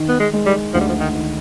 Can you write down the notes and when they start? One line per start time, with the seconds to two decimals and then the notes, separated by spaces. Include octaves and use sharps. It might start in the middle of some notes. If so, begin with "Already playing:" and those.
Already playing: D#3
0.09 B3
0.20 G#3
0.33 G#3
0.46 G3
0.73 D2 F3
0.81 G3
0.89 F3
1.00 D#3
1.13 D#3